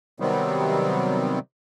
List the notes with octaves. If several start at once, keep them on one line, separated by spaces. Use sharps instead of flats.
C3 D#3 F#3 G3 B3 C4